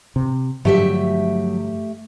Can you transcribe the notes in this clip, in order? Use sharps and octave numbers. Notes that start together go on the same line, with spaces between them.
C3
G2 D3 F3 F#3 A3 G4 E5